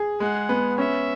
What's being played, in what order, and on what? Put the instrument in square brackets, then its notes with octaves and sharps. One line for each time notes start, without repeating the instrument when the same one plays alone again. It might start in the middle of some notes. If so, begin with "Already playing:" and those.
Already playing: [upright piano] G#4
[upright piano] G#3 [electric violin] F#5
[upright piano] B3
[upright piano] C#4 [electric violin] E5